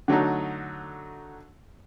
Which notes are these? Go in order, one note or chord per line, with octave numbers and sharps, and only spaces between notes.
D3 F#3 A3 D#4